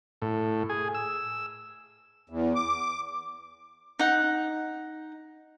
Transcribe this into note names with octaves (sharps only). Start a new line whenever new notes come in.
A2
G#4
E6
E2
D6
D#4 F#5